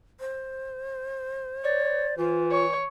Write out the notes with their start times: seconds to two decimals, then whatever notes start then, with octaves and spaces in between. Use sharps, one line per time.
0.20 C5
1.64 C#5 D5
2.18 E3 F4
2.52 C#5